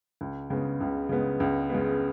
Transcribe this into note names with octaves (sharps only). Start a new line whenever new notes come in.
C#2
C#3 G#3 B3
C#2
C#3 G#3 B3
C#2
C#3 G#3 B3